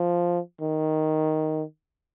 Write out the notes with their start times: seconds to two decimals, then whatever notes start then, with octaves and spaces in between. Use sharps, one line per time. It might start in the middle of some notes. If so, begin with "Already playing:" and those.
Already playing: F3
0.61 D#3